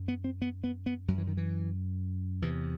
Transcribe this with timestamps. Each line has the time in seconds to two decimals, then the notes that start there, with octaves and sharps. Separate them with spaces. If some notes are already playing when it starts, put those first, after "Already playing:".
Already playing: F#2
0.08 B3
0.24 C4
0.42 B3
0.64 B3
0.86 B3
1.08 F#2 F#3
1.18 E3
1.27 D#3
1.37 E3
2.42 E2 C3 E3